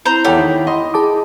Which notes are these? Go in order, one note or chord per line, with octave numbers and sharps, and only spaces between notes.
C4 E4 C5 A#5 C6
E2 G4 A4 C#5 F#5 G5
D#3
D#5 C6
G#4 A5 D6